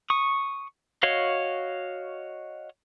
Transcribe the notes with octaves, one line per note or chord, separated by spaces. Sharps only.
C#6 D#6
F#4 C#5 D#5 F5